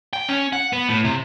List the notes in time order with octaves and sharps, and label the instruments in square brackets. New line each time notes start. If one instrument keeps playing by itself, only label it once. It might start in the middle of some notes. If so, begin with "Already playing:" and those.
[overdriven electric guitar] G5
C#4
F#5
B3
A2
C3